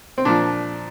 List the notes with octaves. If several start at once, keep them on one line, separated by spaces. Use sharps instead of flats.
C4
A#2 F3 D4